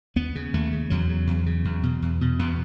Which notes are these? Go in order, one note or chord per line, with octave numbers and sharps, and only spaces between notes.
D#2 B3
C#3
D#2 A3
C#3
E2 F#3
C#3
E2
C#3
E2
B2
E2
B2
E2 B3